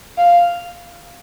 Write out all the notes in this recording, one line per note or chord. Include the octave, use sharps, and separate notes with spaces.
F5